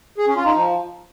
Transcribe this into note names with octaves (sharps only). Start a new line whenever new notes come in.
G#4
C#4
F4
D#4
F3